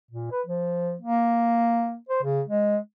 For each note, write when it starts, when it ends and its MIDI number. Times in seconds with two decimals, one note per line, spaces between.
0.11 0.31 46
0.31 0.42 71
0.47 0.95 53
1.02 1.96 58
2.09 2.21 72
2.23 2.42 49
2.47 2.77 56